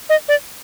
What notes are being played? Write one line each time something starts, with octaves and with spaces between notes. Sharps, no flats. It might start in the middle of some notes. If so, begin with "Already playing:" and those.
D#5
D5